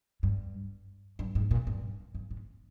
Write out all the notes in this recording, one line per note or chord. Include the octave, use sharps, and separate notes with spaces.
G2
G2
G#2
A#2
G2
G2
G#2